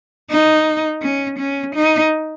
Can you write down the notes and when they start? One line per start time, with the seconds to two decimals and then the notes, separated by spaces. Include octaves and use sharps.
0.31 D#4
1.02 C#4
1.39 C#4
1.75 D#4